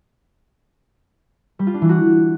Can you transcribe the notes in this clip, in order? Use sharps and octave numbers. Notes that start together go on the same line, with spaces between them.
G3
F4
D4
E3
F#4